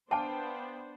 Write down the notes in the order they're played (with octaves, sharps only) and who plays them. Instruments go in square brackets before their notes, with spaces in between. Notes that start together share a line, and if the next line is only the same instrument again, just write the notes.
[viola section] B3 D4 C5 [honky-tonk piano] F5 G5 D6 [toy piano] A5